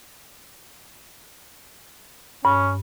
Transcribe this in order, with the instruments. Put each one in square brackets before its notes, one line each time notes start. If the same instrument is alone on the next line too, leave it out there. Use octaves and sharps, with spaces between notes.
[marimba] G2 [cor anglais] C#4